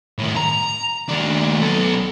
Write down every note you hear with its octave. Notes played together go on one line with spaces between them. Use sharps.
A2 D#3
A#5
D#2 D4
B1 A4